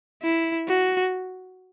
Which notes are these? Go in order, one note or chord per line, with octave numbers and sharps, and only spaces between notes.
E4
F#4